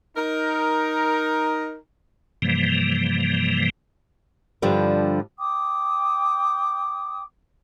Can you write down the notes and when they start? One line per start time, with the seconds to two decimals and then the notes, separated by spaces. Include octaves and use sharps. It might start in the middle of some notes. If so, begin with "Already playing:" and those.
0.16 D#4 A#4
2.42 G2 C3 E3 F3 G3 A#3
4.62 G2 D3 F3 G3 D4
5.39 G5 D6 D#6